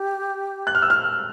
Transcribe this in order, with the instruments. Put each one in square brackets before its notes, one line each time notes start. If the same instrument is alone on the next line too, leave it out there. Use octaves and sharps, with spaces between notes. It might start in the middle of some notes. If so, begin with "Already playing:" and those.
Already playing: [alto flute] G4
[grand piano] F#6
F6
E6
F6